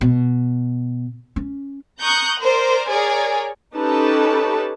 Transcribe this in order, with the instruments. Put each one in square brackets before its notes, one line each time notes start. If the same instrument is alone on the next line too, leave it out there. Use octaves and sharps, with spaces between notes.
[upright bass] B2
C#4
[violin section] A#5 C#6 D#6 F#6 G6
A#4 C5 D5
G#4 A#4 C#5 D5 G#5
[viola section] C#4 D#4 G4 A4 B4 A5